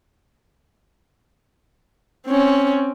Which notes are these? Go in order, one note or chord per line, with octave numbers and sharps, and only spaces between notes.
C4 C#4